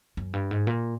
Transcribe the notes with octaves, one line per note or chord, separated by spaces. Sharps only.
F#2
G2
G#2
A#2